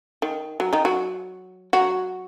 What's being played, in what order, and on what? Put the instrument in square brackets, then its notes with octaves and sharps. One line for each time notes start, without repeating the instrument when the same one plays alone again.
[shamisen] D#3
F#3
D#3 D#4
F#3 F#4
F#3 F#4